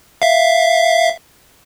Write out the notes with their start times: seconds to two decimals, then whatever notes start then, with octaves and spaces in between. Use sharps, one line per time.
0.22 E5 F5